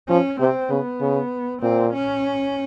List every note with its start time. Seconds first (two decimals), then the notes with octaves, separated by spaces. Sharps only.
0.09 F3 C#4
0.40 C3 C4
0.70 C#3 B3
1.01 C#3
1.62 A#2 C4
1.93 C#4